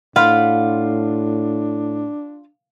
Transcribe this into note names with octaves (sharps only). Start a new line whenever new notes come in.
A2 D4 F4 F5 F#5 B5